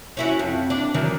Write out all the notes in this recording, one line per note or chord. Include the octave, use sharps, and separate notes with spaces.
C#4 E4 F#4
F2
D4
D#3 E3 F#3